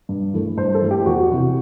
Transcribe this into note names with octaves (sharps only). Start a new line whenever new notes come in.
G2
E3 A3
G2 C5
A4
E3 A3
G4
E2 F#4
C3 E3